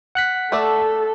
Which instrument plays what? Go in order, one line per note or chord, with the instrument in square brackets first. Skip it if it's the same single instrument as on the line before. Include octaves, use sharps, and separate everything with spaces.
[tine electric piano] F#5 F#6 B6
[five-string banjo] A3 D5 E5 [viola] A4